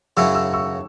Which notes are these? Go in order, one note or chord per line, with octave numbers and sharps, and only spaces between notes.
F#2 C#3 F#3 C#4 E4 E6
E6
C#6 E6